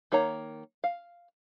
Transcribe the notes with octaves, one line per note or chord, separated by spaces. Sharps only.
D#3 A#3 C#5 A#5
F5